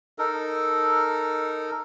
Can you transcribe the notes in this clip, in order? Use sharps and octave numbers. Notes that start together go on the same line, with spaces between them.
D#4 A4 A#4